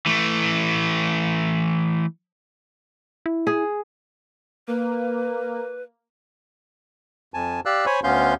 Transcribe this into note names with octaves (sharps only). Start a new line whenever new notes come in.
E3 A3
E4
G#4
A#3 B4
F2 G#5 A5
G4 D5 F5 E6 F#6
C5 C#5 G#5 B5 C#6
D2 B3 C#4 F5 C6 G6